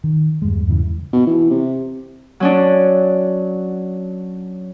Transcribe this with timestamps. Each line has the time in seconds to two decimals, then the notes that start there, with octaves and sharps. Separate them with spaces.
0.04 D#3
0.42 E2 G2 G#3
0.67 E2 G2 C#3 E3
1.13 B2
1.27 E3
1.50 C3
2.40 F#3 C#4 D4